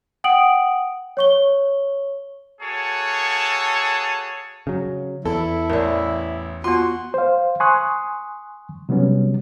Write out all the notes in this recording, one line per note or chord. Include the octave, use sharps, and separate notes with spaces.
F#5 G5 D#6 D7 F#7
C#5 C#6 G7
A#3 F#4 G#4 A4 C#5 A5
C#3 F#3
E2 E4 A4
A1 A#4 D5
B3 F4 F#4 C6
C5 F5
G#5 C6 C#6 D#6 F#6
C3 F#3 G3 B3 C#4